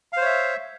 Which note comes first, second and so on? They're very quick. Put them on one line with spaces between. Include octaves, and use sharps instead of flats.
F5 C5 C#5 E5